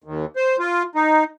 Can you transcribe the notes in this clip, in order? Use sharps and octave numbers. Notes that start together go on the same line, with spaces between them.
D#2
C5
F4
D#4